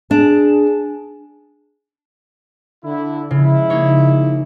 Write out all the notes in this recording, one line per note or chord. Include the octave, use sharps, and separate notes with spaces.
D4 G#4
D3 E4
C#3 F3 G#3 E4
A#3 D#4 C#5